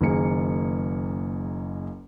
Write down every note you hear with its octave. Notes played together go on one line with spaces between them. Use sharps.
F#1 D#3 A#3 G#4 C#7